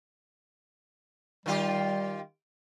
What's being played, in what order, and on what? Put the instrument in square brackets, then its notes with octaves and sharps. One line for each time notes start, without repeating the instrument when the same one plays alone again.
[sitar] D#3 F4 G4 [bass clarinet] G3